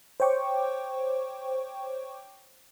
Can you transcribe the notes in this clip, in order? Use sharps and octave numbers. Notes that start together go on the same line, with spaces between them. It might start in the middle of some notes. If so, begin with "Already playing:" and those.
C5 C#5 G5 C#6 D6